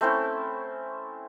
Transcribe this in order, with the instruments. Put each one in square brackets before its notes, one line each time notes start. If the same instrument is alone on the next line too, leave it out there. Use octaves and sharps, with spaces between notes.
[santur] A3 C4 C#4 E4